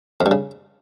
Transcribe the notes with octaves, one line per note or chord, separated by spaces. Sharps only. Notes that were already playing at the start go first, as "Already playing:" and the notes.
F2
G2
C#3